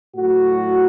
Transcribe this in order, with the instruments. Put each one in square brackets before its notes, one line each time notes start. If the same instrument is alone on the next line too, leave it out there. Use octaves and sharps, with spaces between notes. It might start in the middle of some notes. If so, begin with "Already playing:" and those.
[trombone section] A2 F#3 F#4